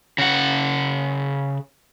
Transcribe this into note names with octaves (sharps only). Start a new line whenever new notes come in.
C#3 F#5